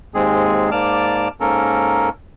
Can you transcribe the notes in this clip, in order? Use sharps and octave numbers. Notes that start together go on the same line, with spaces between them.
D#2 G#2 G#3 C4 G#4
G#2 A#3 D5 A5 D6 F6
G#2 A#3 C#4 A4 A#4